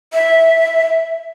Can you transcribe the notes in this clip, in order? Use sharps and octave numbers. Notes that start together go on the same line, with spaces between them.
E5